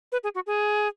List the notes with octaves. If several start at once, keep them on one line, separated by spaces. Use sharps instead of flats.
B4
G#4
F#4
G#4